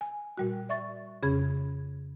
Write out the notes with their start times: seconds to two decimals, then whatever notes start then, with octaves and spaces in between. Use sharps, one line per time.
0.01 G#5
0.38 A#2 G3 F#4
0.69 D5 E5 C#6 A6
1.23 F2 C#3 C#4 G#4 B5 G#6